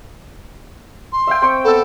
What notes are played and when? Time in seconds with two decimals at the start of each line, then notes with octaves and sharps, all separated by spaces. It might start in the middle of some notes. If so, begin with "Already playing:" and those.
1.13 C6
1.27 E5 F5 G5
1.42 C4 C5 C#6
1.64 B3 A4 E6